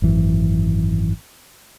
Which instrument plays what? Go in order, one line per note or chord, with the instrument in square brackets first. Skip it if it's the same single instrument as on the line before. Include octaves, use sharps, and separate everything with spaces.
[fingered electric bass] G#1 F#2 E3